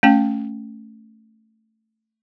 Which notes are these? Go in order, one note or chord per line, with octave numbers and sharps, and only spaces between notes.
A3 C#4 G5